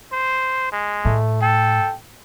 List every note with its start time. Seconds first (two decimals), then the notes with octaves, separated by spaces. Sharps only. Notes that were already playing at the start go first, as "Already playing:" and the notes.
0.13 C5
0.72 G#3
1.05 A2 A3
1.42 A4 G5